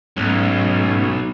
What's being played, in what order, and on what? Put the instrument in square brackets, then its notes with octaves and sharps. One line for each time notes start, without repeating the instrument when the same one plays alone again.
[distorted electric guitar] B1 [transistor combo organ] G#2 A3 C#4